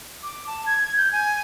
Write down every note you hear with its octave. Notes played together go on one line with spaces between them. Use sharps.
D6
A5
G#6
G6
G#5